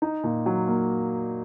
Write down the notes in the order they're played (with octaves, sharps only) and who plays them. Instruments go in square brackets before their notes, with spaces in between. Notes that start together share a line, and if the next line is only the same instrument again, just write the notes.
[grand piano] D#4
A#2
F#3
A#3